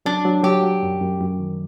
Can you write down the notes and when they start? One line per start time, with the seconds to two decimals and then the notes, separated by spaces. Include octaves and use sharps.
0.06 F#3 D4
0.25 F#3
0.43 F#3 G4
0.63 F#3
0.83 F#2
1.01 F#2
1.20 F#2
1.39 D#3